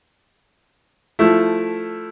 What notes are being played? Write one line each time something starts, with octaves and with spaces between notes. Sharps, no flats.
F3 A3 E4